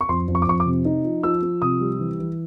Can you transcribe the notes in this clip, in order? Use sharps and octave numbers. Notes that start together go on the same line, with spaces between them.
C#6
F2 C6
F2
C#6
D6
F2 C#6
D6
C3
D#4
F3
F3 E6
F3
C3 D#6
G3
E3
E3